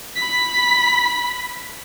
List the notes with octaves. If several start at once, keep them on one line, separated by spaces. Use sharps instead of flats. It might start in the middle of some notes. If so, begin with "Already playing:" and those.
B5 B6